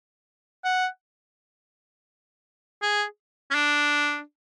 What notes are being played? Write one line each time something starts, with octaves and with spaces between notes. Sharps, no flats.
F#5
G#4
C#4
D4